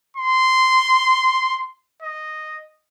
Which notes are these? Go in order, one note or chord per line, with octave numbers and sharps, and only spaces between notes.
C6
D#5